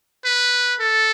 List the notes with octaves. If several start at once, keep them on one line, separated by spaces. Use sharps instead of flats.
B4
A4